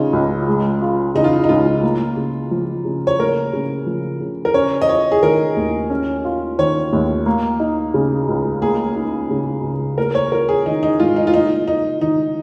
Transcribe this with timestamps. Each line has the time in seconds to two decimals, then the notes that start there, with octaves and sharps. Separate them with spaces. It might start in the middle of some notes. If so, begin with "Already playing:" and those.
Already playing: C#3 C#4 D#4 F4
0.13 C#2
0.48 G#3
0.82 F4
1.15 C#3 D#4
1.24 F4
1.33 D#4
1.44 D#4
1.49 C#2 F4
1.83 A#3
2.17 C#3
2.51 F3
2.85 C#3
3.07 C#5
3.19 A#3 A#4
3.53 C#3
3.86 F3
4.21 C#3
4.45 A#4
4.54 C#4 C#5
4.81 D#5
4.89 F4 C#5
5.12 G#4
5.23 D#3 A#4
5.57 D#2
5.90 C#4
6.25 F4
6.59 D#3 C#5
6.93 D#2
7.26 A#3
7.60 D#4
7.94 C#3
8.29 C#2
8.61 A#3 G#4
8.96 D#4
9.30 C#3
9.63 C#2
9.98 A#3 A#4
10.15 C#5
10.32 F4 A#4
10.49 G#4
10.66 D#3 D#4
10.83 D#4
10.99 G#2 F4
11.16 D#4
11.27 F4
11.34 A#3 D#4
11.67 D#4 F4
12.01 D#3 D#4